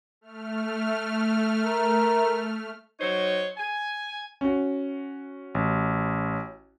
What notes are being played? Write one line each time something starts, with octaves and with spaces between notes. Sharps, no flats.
A3 F6
A#4
F#3 D#4 C5 C#5
G#5
C#4 F#4
A1